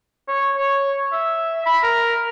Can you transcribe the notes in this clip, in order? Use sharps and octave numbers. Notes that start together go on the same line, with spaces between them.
C#5
C#5
E5
B5
A#4